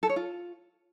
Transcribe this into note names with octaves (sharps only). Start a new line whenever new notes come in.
A4
C#5
F4